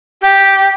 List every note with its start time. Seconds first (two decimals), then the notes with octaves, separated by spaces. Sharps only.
0.21 G4